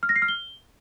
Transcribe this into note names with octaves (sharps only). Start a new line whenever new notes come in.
F6
A#6
C7
F6
G7